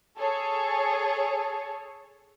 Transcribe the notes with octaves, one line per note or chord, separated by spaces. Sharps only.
G#4 A4 C#5